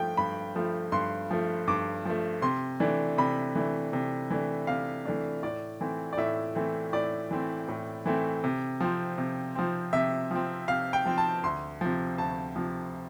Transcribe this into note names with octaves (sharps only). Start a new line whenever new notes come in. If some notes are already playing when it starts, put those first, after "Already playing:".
Already playing: G2 F3 A3 G5
G2 B5
F3 A3
G2 C6
F3 A3
G2 D6
F3 A3
C3 C6
E3 A3 D4
C3 B5
E3 A3 D4
C3
E3 A3 D4
C3 F5
E3 A3 D4
A2 D5
E3 A3 C4
D5
A2 E5
E3 A3 C4
A2 D5
E3 A3 C4
A2
E3 A3 C4
C3
F3 C4
C3
F3 C4
C3 E5
F3 C4
C3 F5
G5
F3 C4
A5
D2 C6
C3 F3
D2 A5
C3 F3